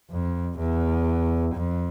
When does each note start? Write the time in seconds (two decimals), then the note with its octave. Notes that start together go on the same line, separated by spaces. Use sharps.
0.11 F2
0.59 E2
1.55 F2